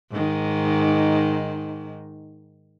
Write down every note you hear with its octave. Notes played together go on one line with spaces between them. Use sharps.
G#2 D#3